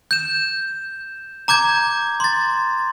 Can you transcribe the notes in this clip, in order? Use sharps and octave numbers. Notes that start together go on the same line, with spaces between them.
G6 E7
A#5 D6 G6 G#6
C6 A6